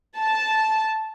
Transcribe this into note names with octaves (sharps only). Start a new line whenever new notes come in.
A5